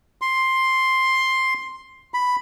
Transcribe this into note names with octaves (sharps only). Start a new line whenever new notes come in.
C6
B5